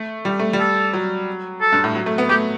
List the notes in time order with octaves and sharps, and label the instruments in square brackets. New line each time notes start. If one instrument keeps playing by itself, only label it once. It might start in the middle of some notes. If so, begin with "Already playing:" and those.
Already playing: [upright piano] A3
G3
A3
G3
[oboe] A4
[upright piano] F#3
[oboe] A4
[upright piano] G2
A2
F#3
A3
B3
[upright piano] A3 [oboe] G4